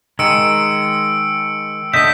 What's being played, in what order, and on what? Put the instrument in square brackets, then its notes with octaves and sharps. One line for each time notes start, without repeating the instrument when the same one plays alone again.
[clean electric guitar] D#3 G#3 [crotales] E6 C#7 D7
[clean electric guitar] D3 D#5 E5 [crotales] G6 B6